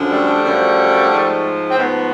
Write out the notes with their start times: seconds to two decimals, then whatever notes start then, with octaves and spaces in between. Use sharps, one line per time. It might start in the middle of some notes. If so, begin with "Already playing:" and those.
Already playing: F#2 D3 F3
0.11 G3 A3
0.44 F#2 D3 F3
1.10 G#2 F3
1.70 C4
1.77 G#2 F3 A3 B3